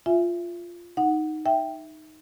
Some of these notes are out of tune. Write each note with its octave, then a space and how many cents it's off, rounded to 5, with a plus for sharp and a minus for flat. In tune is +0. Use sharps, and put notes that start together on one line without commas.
F4 -5 E5 +25 G#5 +0
D#4 +0 F#5 +0
E5 +0 G5 +0